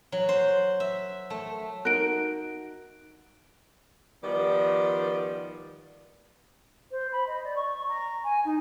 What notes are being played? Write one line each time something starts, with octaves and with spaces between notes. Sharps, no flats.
F#3
C5
E5
A3
D#4 F#4 A#4 F#6 D7
D#3 F3 G3 B3 D5
C5
B5
D#5
D5
C#6
A#5
G#5
D#4